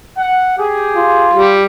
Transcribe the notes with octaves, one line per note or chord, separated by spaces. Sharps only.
F#5
G4 G#4
F4
G3